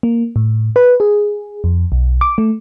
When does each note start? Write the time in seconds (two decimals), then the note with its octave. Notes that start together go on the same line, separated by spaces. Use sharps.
0.03 A#3
0.36 A2
0.76 B4
1.00 G#4
1.64 F2
1.92 B1
2.21 D6
2.38 A3